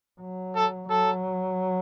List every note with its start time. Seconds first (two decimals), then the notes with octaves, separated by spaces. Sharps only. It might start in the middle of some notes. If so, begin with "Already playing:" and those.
0.21 F#3
0.56 A4
0.89 F#3 A4